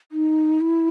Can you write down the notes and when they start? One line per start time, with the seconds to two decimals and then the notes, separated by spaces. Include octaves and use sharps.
0.12 D#4
0.61 E4